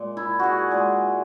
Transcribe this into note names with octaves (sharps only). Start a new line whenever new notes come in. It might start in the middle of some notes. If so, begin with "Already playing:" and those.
Already playing: A#2 G#3
E4
F#4 G#4
A#2 G#3 G#4